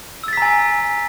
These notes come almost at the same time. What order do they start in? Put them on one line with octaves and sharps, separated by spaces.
E6 A6 B6 A#5 G#5